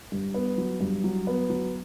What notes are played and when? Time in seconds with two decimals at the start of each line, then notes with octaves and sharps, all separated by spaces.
0.12 G2
0.34 B3
0.58 F#3
0.80 G2
1.04 F#3
1.27 B3
1.50 F#3